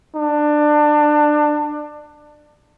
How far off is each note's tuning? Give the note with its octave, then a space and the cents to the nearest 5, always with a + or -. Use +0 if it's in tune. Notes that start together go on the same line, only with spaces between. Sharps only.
D4 +20